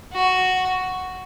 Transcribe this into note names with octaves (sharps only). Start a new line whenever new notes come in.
F#4